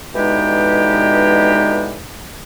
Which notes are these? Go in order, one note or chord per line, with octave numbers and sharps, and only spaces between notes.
B2 D3 E3 G#3 D#4 G4